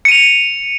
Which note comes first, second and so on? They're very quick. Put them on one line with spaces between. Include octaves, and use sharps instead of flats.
C#7 D#7 F7